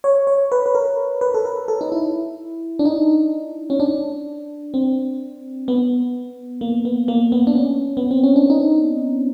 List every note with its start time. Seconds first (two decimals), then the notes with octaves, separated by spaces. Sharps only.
0.04 C#5
0.27 C#5
0.52 B4
0.66 B4
0.75 A#4
1.21 B4
1.34 A4
1.46 A#4
1.68 A4
1.81 D#4
1.92 E4
2.79 D4
2.85 D#4
3.70 C#4
3.80 D4
4.74 C4
5.68 B3
6.61 A#3
6.85 B3
7.08 A#3
7.32 B3
7.47 D4
7.55 C#4
7.97 B3
8.11 C4
8.23 C#4
8.36 D4
8.50 D#4